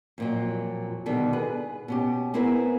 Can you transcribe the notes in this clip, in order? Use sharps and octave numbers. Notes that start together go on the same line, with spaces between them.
F2 A#2 F#3
B2 D3 D#3 G3
G#4 B4
B2 C#4 G4
B3 C4 E4 G#4 A#4 B4